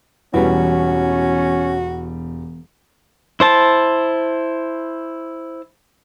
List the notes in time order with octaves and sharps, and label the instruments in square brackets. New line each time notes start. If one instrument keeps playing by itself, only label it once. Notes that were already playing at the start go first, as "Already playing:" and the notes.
[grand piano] E1 G3 [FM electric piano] E3 B3 [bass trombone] C#4 [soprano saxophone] F#4
[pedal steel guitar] E4 C5 A5